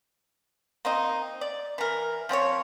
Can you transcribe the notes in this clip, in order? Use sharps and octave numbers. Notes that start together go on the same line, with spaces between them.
A#3 C4 D#4
D5
E3 A#4
F3 C4 G#4 C#5